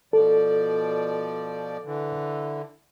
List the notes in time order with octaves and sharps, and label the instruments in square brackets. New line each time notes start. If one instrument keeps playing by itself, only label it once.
[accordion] B2 F3 D5 [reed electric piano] A4
[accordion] D3 E3